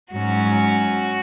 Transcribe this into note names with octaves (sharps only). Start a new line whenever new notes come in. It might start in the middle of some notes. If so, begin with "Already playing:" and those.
G#2 F#3 C#4 F#4